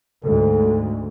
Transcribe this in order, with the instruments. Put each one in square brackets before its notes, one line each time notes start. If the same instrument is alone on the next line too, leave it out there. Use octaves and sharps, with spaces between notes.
[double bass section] D2 G#2 [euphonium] A4